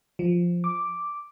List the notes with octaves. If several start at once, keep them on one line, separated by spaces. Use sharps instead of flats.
F3
D6